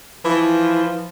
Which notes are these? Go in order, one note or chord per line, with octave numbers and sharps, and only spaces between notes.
E3 F3